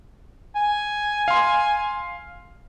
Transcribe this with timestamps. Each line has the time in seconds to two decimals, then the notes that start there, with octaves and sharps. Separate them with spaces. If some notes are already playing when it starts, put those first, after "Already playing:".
0.56 G#5
1.28 F5 C6